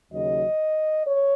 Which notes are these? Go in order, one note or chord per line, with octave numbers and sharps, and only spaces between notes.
D#2 C#3 F#3 D#5
C#5